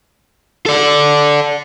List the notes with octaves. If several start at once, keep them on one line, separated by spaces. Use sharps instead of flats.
A4 D5